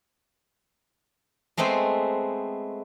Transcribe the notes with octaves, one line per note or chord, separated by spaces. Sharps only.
G#3 A3 B3 C4 C5